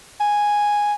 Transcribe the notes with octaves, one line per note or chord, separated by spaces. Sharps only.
G#5